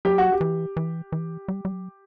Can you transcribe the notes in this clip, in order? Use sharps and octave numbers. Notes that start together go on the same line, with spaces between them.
F#3 G4
F#4
G4
E3
E3
E3
G3
G3
F#3